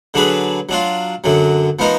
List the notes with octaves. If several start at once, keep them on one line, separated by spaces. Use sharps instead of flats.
D3 F#3 D4 G#4 B4
F#3 D4 F4
F#2 D3 F#3
F3 B3 D#4 A#4